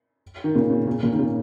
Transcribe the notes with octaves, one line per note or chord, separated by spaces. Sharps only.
D#3
A#2 C#3
A#2
A#2 C#3
A#2 C#3
D#3
A#2 C#3